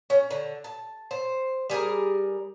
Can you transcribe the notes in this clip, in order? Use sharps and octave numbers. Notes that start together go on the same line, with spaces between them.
C#4
D3
A5
C5
G3 G#4 A#4